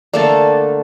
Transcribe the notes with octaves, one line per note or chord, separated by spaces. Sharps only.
D3 A3 A#3 D5 A6